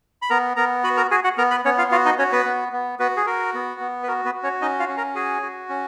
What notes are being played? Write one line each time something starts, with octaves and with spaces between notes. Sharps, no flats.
B5
B3 A#4 A#5
B3 A#4 A#5
F#4 B4 B5
A#4 A#5
F#4 G#4 G#5
F#4 F#5
B3 A#4 A#5
B4 B5
B3 C#4 C#5
F4 F5
F4 F#4 F5
D#4 D#5
C#4 F#4 C#5
B3 B4
B3
B3
B3 F#4 B4
G#4
F#4 A#4
B3
B3
B4
F#4 A#4
B3 B4
F#4
C#4 C#5
C#4 D#4 D#5
F4 F5
C#4
A#4 A#5
F#4 G#4 G#5
F#4
C#4